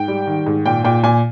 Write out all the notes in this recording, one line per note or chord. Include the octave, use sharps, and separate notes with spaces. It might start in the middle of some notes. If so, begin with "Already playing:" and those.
Already playing: G#2 G5
G3
D#3
G#2
A#2 G5
A#2 G5
A#2 G#5